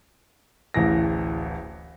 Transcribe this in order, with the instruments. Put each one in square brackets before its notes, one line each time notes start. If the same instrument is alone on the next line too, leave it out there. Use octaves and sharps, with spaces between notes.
[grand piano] D1 A1 E3 A#6